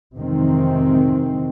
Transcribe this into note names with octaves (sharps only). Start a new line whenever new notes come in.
F2 C3 D#3 E3 G#3 C4